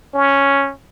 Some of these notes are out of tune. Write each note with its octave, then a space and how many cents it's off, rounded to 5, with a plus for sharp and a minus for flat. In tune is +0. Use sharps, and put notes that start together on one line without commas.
C#4 +0